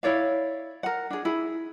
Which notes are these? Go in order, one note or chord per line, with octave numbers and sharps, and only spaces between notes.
E4 C#5 D5 F5
A#4 F#5
D4 G#4
E4 G#4